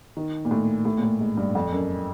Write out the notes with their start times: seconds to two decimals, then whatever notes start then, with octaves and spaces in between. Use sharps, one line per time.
0.17 D#3
0.45 A#2
0.51 A2
0.85 A2
0.98 A#2
1.03 A2
1.20 G#2
1.37 G2
1.55 F2
1.72 F#2